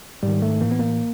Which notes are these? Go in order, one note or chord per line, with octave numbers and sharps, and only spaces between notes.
G#2 D#3 G3
A3
A2 E3 A#3
B3
A#3